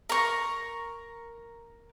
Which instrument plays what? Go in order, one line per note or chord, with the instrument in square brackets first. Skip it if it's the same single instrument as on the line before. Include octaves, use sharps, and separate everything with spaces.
[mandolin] A#4 C#6